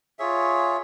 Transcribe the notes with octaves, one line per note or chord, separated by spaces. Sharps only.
F4 G#4 C#5 E5